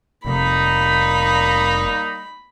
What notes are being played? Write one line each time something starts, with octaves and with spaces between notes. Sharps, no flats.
F1 G3 A#3 D#4 B5